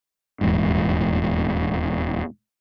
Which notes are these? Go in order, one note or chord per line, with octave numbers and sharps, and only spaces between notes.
D#1 E2 G#2